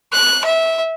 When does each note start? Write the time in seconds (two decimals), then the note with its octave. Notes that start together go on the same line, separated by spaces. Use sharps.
0.12 F#6
0.45 E5